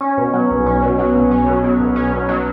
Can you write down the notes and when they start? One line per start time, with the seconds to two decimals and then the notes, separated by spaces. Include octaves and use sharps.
0.01 C#4
0.18 B2
0.33 F#3
0.51 B1
0.66 C#4
0.82 B2
0.99 F#3
1.15 B1
1.31 C#4
1.47 B2
1.64 F#3
1.80 B1
1.96 C#4
2.12 B2
2.29 F#3